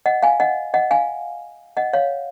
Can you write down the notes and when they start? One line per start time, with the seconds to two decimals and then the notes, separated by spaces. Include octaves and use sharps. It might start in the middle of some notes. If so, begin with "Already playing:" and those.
0.06 D#5 F#5
0.23 F5 G#5
0.40 D#5 F#5
0.74 D#5 F#5
0.91 F5 G#5
1.77 D#5 F#5
1.93 C#5 F5